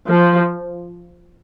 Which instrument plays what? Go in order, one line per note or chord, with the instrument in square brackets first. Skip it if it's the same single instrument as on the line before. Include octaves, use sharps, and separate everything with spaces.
[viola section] F3